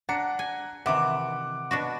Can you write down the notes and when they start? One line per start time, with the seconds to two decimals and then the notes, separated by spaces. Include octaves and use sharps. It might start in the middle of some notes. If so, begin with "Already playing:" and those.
0.09 D4 F#5 A#5 C#7
0.39 G#5
0.86 C3 D#3 E3 F#5 D6
1.71 B2 D4 F#4